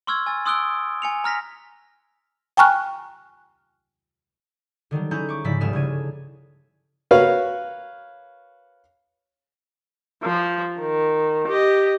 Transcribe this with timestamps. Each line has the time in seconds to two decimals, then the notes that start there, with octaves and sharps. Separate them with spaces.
0.07 C6 C#6 E6 F6 G#6
0.26 G#5 E6 A6
0.45 C6 D#6 E6 F#6 D7 G7
1.02 G#5 C#7 F7
1.24 A#5 F6 A#6 B6
2.57 G5 G#5 A#5 C#6 F6 F#6
4.91 D3 D#3 F#3 G3
5.11 C#4 E4 G#4 A#5 G6
5.29 C#6 D6
5.44 G#2 C#3 F3 E4 D5 B6
5.61 G1 C#2 G#3 G#4 F6 E7
5.73 C#3 A#3 D4 G#6 D#7
7.11 F#4 A#4 B4 C#5 F5
10.23 F3
10.79 D#3
11.47 G4 D#5